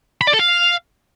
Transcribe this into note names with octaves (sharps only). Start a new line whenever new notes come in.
B5
D5
A4
F5